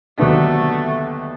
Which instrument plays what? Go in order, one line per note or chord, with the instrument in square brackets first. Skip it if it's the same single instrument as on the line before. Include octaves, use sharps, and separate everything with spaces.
[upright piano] D#2 D3 F#3 B3 D4 [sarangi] A3